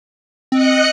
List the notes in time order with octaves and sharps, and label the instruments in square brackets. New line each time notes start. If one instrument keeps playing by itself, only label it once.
[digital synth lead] C4 [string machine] D#5 F#6 C#7